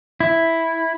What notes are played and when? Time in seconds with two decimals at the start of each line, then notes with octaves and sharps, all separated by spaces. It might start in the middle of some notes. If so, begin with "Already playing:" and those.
0.20 E4